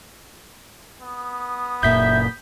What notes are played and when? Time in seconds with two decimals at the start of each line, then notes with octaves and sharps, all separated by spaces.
1.00 B3 D#6
1.83 F#1 A#2 E5 G6 B6